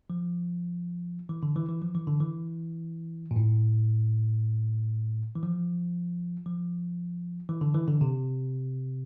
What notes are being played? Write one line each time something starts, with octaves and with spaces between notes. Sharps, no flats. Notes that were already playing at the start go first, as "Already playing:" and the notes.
F3
E3
D3
E3
E3
F3
E3
D3
E3
A#2
A2
E3
F3
F3
E3
D3
E3
D3
C3